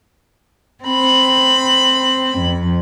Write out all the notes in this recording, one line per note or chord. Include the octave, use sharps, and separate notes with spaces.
C4 B5
F2